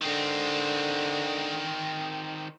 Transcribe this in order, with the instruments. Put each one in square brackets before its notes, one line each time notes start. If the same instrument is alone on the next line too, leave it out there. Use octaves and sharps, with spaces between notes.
[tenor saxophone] D3 [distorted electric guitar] D#3 C4